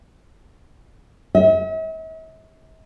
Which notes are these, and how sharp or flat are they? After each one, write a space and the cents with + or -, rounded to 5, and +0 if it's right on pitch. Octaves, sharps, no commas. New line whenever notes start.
E5 -45